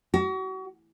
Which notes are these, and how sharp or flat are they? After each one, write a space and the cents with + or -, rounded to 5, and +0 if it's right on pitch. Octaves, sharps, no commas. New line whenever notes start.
F#4 +35